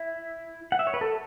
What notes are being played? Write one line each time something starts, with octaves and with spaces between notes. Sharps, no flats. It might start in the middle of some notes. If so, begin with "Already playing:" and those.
Already playing: E4
F#5
E5
C#5
B4
A4